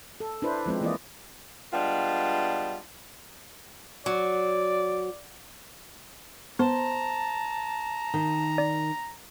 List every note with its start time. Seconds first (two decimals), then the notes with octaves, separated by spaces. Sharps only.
0.20 A4
0.42 D4 E4 B4 C5
0.66 F3 G#3 C4 B4
0.81 E3 A#3 E4 F4 D5 D#5
1.73 G3 G#3 B3 D4 F4
4.06 F#3 D5
6.59 B3 C5 A5 A#5
8.14 D#3
8.58 D5